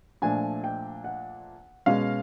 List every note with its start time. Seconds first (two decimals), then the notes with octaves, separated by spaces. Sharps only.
0.22 A#2 F3 A3 D4 G#5
0.64 G5
1.04 F#5
1.86 B2 G#3 C#4 F5